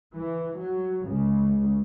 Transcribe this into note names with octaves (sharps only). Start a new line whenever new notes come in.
E3
F#3
C#2 C#3